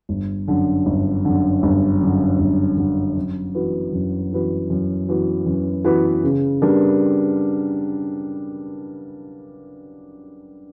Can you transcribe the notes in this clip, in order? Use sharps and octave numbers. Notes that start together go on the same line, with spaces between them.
G1
F#2 D3
G1
F#2 D3
G1
F#2 D3
G1
F#2 D3
F#2
E3 B3 F#4 B4
F#2
E3 B3 F#4 B4
F#2
E3 B3 F#4 B4
F#2
E3 B3 F#4 B4
C#3
G3 B3 D4 A#4